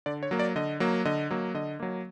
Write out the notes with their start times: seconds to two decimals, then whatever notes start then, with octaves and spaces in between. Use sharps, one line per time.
0.06 D3 D5
0.23 C#5
0.31 F#3 A#3
0.39 D5
0.56 D3 D#5
0.80 F#3 A#3
1.05 D3 D#5
1.31 F#3 A#3
1.54 D3 D#5
1.80 F#3 A#3